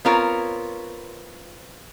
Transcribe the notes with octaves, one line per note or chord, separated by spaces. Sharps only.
B3 C4 F4 A#4 C#5